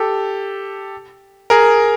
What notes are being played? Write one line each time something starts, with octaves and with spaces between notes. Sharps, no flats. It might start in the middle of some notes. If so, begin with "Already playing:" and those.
Already playing: G4 A4
G#4 A#4